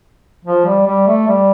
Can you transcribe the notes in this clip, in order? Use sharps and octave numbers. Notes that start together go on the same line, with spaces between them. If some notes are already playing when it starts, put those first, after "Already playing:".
F3
G3
G3
A3
G3